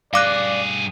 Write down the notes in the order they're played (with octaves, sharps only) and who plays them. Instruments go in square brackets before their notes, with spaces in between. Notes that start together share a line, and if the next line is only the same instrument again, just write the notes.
[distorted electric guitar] G2 G#4 [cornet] D5 [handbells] F5 D6 F#6